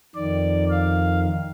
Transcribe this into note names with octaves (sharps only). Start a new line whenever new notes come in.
F2 D#3 D5
F5